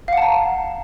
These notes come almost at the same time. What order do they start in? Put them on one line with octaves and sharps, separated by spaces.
F5 F#5 A5 A#5